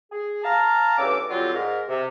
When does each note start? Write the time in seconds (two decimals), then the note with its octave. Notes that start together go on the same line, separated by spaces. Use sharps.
0.12 G#4
0.44 F5 A5 A#5
0.98 E2 G2 C#4 A4 D6
1.29 D3 F#3 G3 C4 F4
1.54 G#2 A#4
1.88 C3